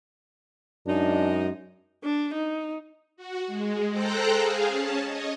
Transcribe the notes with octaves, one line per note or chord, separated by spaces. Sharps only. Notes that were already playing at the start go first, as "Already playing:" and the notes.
F#2 G#3 D4 D#4
D4
D#4
F#4
G#3
A4 C5 G5 A#5 F#6
G#4 F5
C#4 A5
C#5 D#5